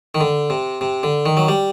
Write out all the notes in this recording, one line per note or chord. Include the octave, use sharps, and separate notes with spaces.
D#3
D3
C3
C3
D3
D#3
F#3
G3